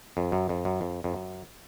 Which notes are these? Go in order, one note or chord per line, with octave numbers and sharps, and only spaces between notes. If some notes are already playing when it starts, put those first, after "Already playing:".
F2
F#2
F2
F#2
F2
F2
F#2